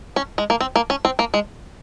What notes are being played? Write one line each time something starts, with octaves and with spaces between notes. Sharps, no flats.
C#4
G#3
A#3
C4
A#3
C#4
C4
A#3
G#3